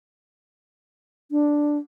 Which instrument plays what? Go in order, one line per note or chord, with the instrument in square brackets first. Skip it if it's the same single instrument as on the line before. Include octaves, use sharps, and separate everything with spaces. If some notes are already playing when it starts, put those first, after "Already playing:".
[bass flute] D4